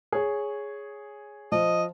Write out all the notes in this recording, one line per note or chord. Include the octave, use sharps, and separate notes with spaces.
G#4 C#5
F3 D#5